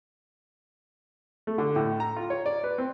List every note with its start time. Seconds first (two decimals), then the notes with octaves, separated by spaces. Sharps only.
1.47 A3
1.58 D3
1.76 A2
2.00 A#5
2.16 F4
2.30 C#5
2.46 D5
2.64 B4
2.78 C4